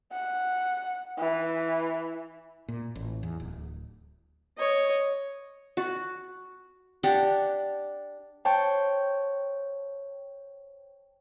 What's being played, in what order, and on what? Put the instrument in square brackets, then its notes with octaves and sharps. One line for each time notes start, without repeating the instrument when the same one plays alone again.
[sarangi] F#5
E3
[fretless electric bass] A#2
A1
E2
D1
[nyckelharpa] C#5 D#5
[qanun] F#4
D4 G4 F#5 G5
[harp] C5 C#5 G5 A5